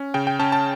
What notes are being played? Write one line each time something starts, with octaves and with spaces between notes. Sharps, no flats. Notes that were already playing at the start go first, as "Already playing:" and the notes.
Already playing: C#4
C#3 G5
G5
C#4 A5
A5